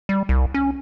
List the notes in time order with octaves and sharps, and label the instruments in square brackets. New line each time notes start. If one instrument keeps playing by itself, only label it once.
[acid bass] G3
C2
C#4